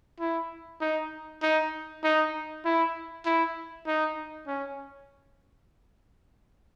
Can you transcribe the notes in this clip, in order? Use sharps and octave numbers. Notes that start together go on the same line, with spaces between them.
E4
D#4
D#4
D#4
E4
E4
D#4
C#4